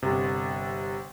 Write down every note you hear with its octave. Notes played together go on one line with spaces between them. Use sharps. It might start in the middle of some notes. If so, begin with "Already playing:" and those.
G1 C3